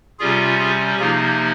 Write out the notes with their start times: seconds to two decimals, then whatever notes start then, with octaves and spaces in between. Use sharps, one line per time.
0.19 C3 G3 C#4 F4 G#4
0.59 F4 G#4
0.98 C3 F3 A#3 D#4 F4 G#4